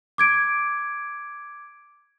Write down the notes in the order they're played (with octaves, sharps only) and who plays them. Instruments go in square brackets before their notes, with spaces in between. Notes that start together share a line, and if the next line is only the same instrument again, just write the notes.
[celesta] D6 G#6 D7